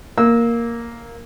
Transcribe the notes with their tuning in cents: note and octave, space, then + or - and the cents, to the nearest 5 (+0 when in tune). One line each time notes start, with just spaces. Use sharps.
A#3 +0 E6 -20